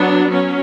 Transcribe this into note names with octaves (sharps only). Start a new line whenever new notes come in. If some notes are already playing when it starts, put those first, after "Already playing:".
Already playing: F#3 B3 D4
F#3 C#4